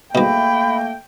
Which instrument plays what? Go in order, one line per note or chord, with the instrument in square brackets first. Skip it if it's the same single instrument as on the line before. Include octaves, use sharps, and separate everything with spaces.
[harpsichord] G#2 B2 [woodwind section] A3 A#3 [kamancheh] G5 [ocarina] B5